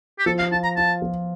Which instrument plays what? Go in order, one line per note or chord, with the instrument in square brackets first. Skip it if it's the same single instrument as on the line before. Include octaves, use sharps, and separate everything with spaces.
[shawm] G4
[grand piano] F3 [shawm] A4
[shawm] F5
[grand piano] F4 [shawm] A5
[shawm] A#5
[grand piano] F4 [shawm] A5
[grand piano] F3